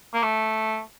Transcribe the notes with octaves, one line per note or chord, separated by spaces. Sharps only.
A#3
A3